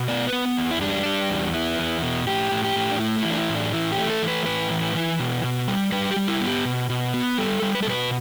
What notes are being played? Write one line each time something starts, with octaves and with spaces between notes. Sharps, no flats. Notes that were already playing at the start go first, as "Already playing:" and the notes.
Already playing: B2
B3 D5
B4
B3
E2
E4
G3 D4
G3
E2
B3 E4
E2
B2
A2 G4
A2
G4
A2
D4
A3 E4
E4
E3
D4
E4
A2
D4
E3 E4
G4
A3
A4
E3
B4
A2 B4
E3
E3
B2
B2
G3
G3 B4
G4
G3
E4
B3
G4
B2
B2
B3
G3 A4
G3
B4
A4
B2 B4